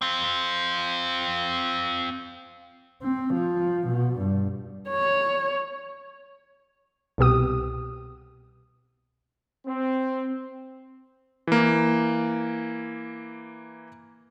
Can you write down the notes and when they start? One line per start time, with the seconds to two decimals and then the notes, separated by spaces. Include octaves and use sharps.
0.02 C4 F4
3.03 C4
3.34 F3
3.88 B2
4.19 G2
4.89 C#5
7.18 C2 B2 G4 D#6
9.67 C4
11.47 E3 A#3